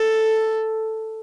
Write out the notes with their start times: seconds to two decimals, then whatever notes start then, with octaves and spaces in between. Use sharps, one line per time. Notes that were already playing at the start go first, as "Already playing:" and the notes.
Already playing: A4